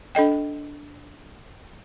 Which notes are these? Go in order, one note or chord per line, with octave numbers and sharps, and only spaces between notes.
D4 A4 D#5 G5